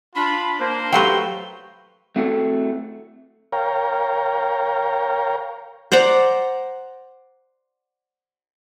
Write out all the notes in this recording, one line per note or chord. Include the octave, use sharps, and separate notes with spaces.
D4 F4 B5
A#3 C5
F#3 A3 G4 B4 F5 G5 C6
A3 C4 E4 F#4 G#4 A4
A#4 C#5 F5 G5 A#5
C5 D5 F#5 A#5